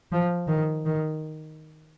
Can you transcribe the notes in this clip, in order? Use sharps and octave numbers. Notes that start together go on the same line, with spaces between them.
F3
D#3
D#3